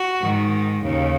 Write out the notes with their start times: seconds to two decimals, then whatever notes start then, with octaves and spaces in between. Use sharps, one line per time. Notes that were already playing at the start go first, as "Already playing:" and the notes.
Already playing: F#4
0.19 G#2 D#3
0.81 D#2 C#3